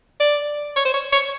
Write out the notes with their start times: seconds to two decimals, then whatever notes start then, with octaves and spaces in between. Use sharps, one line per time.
0.20 D5
0.76 C#5
0.85 C5
0.94 C#5
1.13 C#5